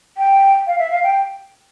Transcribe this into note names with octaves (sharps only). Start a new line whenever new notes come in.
G5
F5
E5
F5
G5